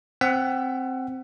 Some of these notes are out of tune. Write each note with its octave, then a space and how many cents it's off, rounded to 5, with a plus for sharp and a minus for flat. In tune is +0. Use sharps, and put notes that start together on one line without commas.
C4 +0 F#5 +20 E6 +30